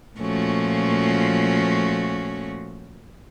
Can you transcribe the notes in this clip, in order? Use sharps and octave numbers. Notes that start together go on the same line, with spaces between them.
A#2 F3 A3 C#4 F#4